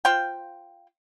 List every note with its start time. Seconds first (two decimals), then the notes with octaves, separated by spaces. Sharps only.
0.05 F4 C5 F5 G5